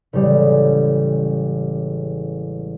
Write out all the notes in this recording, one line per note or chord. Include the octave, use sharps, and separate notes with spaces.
A1 C#3 G3 G#3